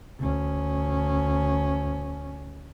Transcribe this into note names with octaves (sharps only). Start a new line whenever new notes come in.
D2 C#4